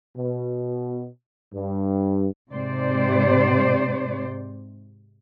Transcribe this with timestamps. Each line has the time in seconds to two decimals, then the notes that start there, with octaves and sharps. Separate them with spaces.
0.17 B2
1.54 G2
2.52 G#2 C3 C5 D5